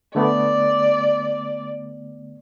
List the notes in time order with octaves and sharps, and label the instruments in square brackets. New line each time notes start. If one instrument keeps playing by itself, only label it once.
[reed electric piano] D3 A3 B3 [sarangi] D5